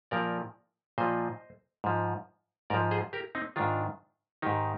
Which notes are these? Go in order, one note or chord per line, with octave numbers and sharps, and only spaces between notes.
A#2 F3 A#4 D5
A#2 F3 C5 D#5
G#2 F3
G#2 F3 A#4 D5
G#4 C5
G4 A#4
C4 D#4
G#2 D#3 D4 F4
G#2 D#3 D#4 G4